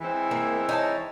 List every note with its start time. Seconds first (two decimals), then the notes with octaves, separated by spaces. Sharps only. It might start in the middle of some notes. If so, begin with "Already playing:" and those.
0.01 E3 G#3 C4
0.31 A#3
0.69 D#4 C#5 A5